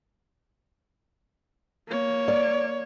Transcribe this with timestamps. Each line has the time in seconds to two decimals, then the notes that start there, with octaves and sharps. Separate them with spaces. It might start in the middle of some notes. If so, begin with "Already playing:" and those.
1.88 A#3 C#5
2.28 D5